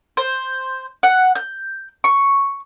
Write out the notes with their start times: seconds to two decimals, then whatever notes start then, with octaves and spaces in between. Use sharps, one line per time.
0.17 C5
1.03 F#5
1.35 G6
2.04 C#6